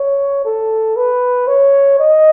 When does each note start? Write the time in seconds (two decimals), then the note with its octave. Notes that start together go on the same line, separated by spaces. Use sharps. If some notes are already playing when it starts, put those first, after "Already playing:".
Already playing: C#5
0.45 A4
0.96 B4
1.48 C#5
1.99 D#5